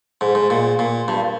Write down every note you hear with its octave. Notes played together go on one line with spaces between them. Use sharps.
G#2
G#2
A#2
A#2
G2